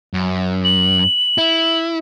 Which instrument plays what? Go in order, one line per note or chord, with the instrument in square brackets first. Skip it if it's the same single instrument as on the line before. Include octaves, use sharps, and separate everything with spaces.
[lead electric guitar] F#2
[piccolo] F#7
[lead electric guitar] E4